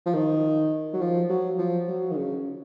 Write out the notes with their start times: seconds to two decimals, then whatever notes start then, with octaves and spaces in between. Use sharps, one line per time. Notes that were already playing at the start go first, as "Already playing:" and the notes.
0.06 F3
0.14 D#3
0.93 F#3
1.01 F3
1.29 F#3
1.58 F3
1.88 F#3
2.11 D#3
2.16 C#3